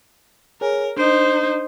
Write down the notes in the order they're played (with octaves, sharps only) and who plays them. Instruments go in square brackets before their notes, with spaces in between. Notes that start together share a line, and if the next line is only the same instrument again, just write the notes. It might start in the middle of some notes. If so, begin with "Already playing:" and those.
[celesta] G#4 C#5 G#5 [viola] A#4
[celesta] D4 D7 [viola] D#4 C5